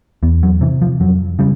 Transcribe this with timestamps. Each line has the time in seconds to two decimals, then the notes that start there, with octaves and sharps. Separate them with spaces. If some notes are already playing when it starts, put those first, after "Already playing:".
0.23 E2 B3
0.43 F#3
0.61 C3 E3
0.82 F3
1.00 F2 F#3
1.39 C#3 G3